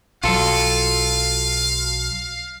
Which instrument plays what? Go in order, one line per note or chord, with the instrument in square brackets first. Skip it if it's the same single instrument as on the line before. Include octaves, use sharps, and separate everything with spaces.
[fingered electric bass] B1 F#3 [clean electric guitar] F4 A4 [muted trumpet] F5